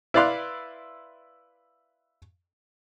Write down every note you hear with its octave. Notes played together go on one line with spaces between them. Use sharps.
E4 B4 D5 F5 C6 F#6